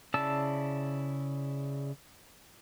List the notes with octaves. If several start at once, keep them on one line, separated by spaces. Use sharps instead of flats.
C#3 E4 D5 A5 E6